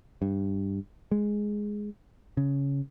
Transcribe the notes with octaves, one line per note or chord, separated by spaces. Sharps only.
G2
G#3
C#3